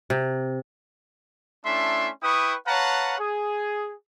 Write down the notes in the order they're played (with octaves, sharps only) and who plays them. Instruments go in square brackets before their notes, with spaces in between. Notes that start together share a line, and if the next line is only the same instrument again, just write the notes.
[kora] C3
[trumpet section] A3 C#4 D4 E4 E5 C6
E4 B4 G5 C#6 D#6
B4 C#5 F5 F#5 A5 A#5
G#4